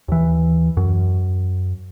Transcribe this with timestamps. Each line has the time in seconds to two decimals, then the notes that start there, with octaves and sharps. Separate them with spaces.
0.08 D#2 E3
0.77 F#2